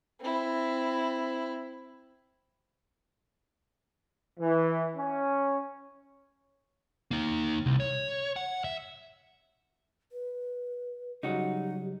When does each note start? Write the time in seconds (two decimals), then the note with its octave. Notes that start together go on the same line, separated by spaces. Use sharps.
0.20 C4 E4
4.40 E3
4.97 C#4
7.11 A#3 D#4
7.66 C2
7.80 C#5
8.36 F#5
8.64 E5
10.12 B4
11.23 C#3 F#3 G3 D#4 F#4 G4